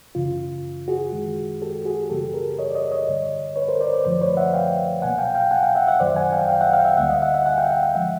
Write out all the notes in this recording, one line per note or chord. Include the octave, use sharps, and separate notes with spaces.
F#2 C#3 E3 F4
F#4 G#4
F#2 D#3 G#3
G4 A4
F#4 G#4
F#2 C#3 E3 G3 A#3 G4 A4
G#4 A#4
C#5 D#5
D5
C#5 D#5
C#5 D#5
G2 D3 G3
B4 C#5
A#4 C5
C5 D5
C5 D5
F#2 D3 F3 A3 C5 D5
B4 C#5
E5 F#5
F5 G5
C2 B2 F#3 A#3 F#5 G#5
F5 G5
F5 G5
F#5 G#5
F5 G5
E5 F#5
E5 F#5
F#2 D#3 F#3 C5 D5
F#5 G#5
F5 G5
F5 G5
E5 F#5
F5 G5
E5 F#5
D2 D3 G3 A#3 E5 F#5
D#5 F5
E5 F#5
E5 F#5
F#5 G#5
F5 G5
E5 F#5
F5 G5
F3 G#3 E5 F#5